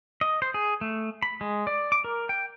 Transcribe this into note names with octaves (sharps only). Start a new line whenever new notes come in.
D#5
C5
G#4
A3
B5
G#3
D5
D6
A#4
G5